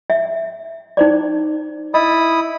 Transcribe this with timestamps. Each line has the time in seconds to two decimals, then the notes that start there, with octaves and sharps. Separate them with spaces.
0.10 E5
0.97 D#4 C5 D5
1.94 E4 D#5 B5 D#6